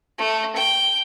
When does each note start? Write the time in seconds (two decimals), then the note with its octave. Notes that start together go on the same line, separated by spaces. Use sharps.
0.18 A3
0.56 G5